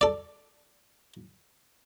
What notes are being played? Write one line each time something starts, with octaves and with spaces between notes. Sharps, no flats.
A4 D5